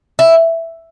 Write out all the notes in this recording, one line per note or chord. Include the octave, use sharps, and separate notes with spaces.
E4